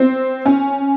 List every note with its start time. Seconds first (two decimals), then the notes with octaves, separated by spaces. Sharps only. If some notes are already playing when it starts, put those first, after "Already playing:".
Already playing: C4
0.46 C#4